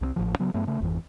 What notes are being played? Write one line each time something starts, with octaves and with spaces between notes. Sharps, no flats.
C2 G3 C4
A1 A2 C#3 F3
C#3 F#3 B3
G2 F#3 A3 B3
C#3 A3
G#1 F2 B2 E3